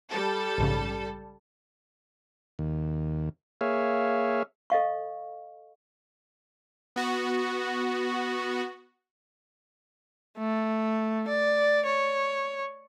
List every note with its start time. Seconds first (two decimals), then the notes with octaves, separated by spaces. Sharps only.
0.10 G3 A4
0.58 A#1 G#2 C#3
2.59 D#2
3.61 A#3 G#4 C#5 E5 F5
4.70 A4 D#5 F5 C#6
6.96 B3 F#4
10.38 A3
11.28 D5
11.86 C#5